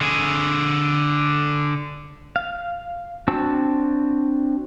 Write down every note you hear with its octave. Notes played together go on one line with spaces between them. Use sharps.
D3 G#4
F5
C4 D4 F#4 A5 E6